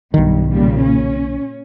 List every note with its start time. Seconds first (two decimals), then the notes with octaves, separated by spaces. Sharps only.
0.14 B1 G2 D#3
0.50 A#2 C#3 G3
0.81 C#4